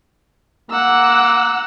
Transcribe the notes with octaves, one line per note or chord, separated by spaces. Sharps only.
A#3 F#5 E6